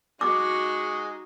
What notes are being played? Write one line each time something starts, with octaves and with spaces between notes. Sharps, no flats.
G#3 D#4 F#4 D6